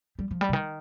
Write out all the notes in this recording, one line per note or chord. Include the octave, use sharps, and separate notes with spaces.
G3
F3
G3
C3
D#3